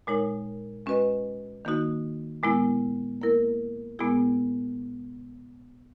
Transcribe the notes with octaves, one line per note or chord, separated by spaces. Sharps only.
A#2 G#3 D#4 A#4 C#5
G#3 C#4 F#4 B4 D#5
D#3 A#3 D#4 F#4
A#2 G#3 B3 E4
A#3 E4 A#4
A#2 G#3 B3 E4 G#4